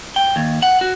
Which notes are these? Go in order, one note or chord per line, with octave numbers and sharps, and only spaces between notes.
G5
D#2
F#5
F#4